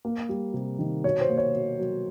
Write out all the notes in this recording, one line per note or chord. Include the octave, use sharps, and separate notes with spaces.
A#3
G3
C3
D#3
B2 C#5
C5
A#3
C#5
B2
F#3